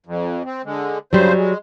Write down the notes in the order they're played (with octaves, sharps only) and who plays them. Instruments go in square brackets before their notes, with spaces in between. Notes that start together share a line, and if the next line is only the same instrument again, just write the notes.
[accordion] F2
C4
D3 G#3
[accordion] G2 C#3 C5 [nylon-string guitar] F#3 G3
[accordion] G#3